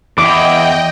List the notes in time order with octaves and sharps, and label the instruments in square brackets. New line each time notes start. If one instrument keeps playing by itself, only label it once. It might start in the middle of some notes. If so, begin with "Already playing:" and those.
[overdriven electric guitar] E2 [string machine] D#5 G5 [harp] D6